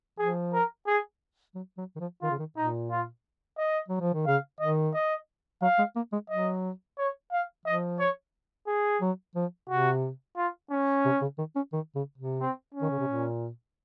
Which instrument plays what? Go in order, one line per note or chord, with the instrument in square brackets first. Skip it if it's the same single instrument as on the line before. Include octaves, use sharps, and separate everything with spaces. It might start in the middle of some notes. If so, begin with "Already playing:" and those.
[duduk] F3 [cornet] G#4
[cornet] A#4
G#4
[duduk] F#3
F#3
D#3
F3
[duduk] D#3 [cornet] F4
[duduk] C#3
D#3
[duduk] A#2 [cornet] D#4
[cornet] F4
D#5
[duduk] F#3
F3
D#3
[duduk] C#3 [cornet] F5
[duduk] D#3 [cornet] D#5
[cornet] D#5
[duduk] F#3 [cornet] F5
[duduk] G#3
A#3
G#3
[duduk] F#3 [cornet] D#5
[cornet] C#5
F5
[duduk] F3 [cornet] D#5
[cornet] C#5
G#4
[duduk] F#3
F3
[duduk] C3 [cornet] F#4
[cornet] F4
C#4
[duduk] C3
C#3
D#3
C#4
D#3
C#3
C3
[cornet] C4
C#4
[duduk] D#3
C#3
C3
A#2